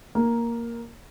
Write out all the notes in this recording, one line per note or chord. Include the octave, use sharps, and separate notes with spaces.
A#3